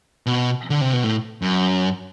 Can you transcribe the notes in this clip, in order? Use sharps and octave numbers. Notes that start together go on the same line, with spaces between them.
B2
D3
C3
B2
A2
F#2